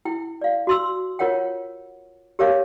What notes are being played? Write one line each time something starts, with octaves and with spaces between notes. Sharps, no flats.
E4 G5
D5 F5
F#4 C6 E6
F4 A#4 C#5 F#5 G5
G4 A#4 C#5 F5 D6